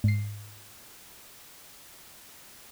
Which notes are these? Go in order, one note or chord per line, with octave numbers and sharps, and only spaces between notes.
G#2 C7